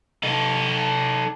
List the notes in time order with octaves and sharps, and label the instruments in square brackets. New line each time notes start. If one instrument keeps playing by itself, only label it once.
[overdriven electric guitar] D#4 A4